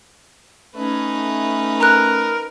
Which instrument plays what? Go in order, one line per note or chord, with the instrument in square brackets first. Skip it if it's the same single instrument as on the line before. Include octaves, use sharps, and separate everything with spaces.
[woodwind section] A3 C#4 [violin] D#4 B4
[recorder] A#4 [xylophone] A#5 F#6